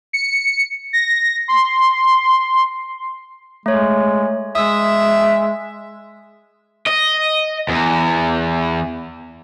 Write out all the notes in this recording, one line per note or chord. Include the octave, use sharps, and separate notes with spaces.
C#7
A#6
C6
C6
G#3 A3 C#5
G#3 E5 D#6 E6
D#5
E2